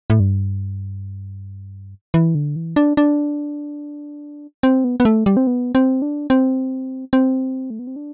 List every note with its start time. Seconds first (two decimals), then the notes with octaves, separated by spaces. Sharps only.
0.10 A2
0.20 G2
2.14 E3
2.35 D3
2.56 E3
2.76 D4
2.97 D4
4.63 C4
4.84 B3
5.00 B3
5.05 A3
5.26 G3
5.37 C4
5.47 B3
5.75 C4
6.02 D4
6.30 C4
7.13 C4
7.70 A3
7.79 B3
7.87 C4
7.96 D4